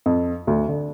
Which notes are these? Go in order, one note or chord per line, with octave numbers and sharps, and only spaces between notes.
F2
D2
D3